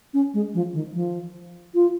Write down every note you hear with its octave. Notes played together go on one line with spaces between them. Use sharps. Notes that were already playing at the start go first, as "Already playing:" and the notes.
C#4
G#3
F3
D#3
F3
F4